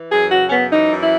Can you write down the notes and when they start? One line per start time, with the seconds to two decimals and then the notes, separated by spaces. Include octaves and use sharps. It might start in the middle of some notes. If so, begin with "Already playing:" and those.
Already playing: E3
0.12 F#2 G#4
0.31 C#3 F#4
0.48 C#4
0.51 F#2 B3
0.72 E3 D#4
0.91 F#2
1.02 E4